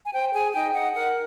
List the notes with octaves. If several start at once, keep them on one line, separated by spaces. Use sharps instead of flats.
G#5
C5 G5
G#4 G#5
D#4 G5
D#4 F#5
A#4 F#5